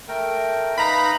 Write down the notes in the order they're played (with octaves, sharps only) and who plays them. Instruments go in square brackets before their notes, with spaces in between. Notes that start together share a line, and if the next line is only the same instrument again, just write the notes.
[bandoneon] A3 A#4 G5
[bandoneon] D#4 B4 F5 [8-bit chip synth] A#5 B5